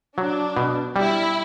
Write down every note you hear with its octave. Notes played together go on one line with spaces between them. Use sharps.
F#3 D4
B2
G3 E4